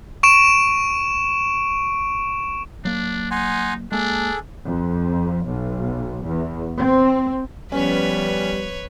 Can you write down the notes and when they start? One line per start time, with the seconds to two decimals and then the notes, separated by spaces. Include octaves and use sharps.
0.23 C#6 D7 E7
2.85 F#3 A#3 D4
3.31 D#4 F#5 G#5 C6
3.92 G#3 A#3 D4 G#4 A4
4.65 F2
5.46 B1
6.23 E2
6.80 C4
7.72 F3 G3 B3 C#4 B4 C#5